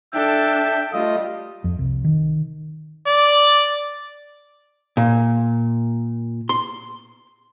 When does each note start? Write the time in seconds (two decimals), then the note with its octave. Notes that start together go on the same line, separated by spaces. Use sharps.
0.13 D4 A4 E5 G5
0.93 G3 A3 F4 D#5
1.64 F2
1.79 C2
2.04 D#3
3.07 D5
4.97 A#2
6.49 C6